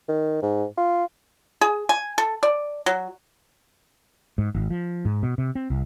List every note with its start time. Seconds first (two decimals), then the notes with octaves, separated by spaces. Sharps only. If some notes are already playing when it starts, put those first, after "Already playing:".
0.08 D#3
0.42 G#2
0.77 F4
1.61 G#4
1.89 G#5
2.18 A4
2.43 D5
2.86 F#3
4.38 G#2
4.55 G#1
4.70 F3
5.05 G#2
5.23 B2
5.38 C3
5.55 C4
5.70 C2